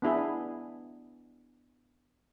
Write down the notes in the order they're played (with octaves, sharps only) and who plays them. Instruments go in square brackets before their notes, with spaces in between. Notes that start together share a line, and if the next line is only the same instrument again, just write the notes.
[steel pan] B3 D4 E4 G#4